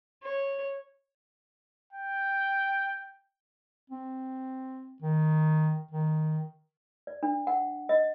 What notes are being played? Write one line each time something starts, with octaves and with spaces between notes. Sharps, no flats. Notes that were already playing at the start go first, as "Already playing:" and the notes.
C#5
G5
C4
D#3
D#3
D5
D4
F#5
D#5